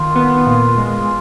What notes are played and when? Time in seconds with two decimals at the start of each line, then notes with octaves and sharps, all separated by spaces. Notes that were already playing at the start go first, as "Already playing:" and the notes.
Already playing: D#3 F4
0.16 B3
0.46 A#2
0.78 G#3